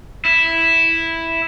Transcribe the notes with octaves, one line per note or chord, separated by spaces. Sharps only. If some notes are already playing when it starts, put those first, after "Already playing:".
E4